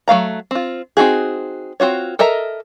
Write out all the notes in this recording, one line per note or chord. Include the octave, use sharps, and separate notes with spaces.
F#3 A3 F5 A#5
C4 F4
C4 D#4 F#4 G#4
C4 F4 F#4 C#5
A4 A#4 D#5 E5 A#5